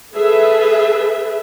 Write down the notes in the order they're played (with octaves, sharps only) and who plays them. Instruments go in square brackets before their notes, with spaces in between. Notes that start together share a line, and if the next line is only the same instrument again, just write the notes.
[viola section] G#4 A4 B4 E5